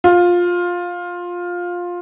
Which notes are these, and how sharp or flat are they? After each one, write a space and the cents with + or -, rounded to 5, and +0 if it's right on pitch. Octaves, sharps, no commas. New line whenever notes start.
F4 +15